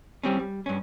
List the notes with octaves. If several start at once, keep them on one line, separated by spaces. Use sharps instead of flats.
G3 C4 C#4
G3
G2 C#4